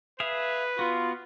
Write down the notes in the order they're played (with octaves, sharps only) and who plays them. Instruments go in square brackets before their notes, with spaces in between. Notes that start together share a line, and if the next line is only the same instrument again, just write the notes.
[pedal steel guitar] G#4 E5 F5 [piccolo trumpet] B4
[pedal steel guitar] B3 F#4 [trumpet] F4